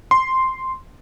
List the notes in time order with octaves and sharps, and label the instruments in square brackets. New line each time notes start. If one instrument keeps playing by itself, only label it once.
[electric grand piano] C6